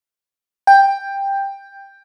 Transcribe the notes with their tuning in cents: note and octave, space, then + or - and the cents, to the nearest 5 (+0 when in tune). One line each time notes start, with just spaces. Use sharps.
G5 +10